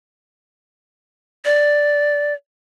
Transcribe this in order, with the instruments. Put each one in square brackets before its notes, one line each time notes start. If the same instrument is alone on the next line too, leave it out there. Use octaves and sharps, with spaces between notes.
[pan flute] D5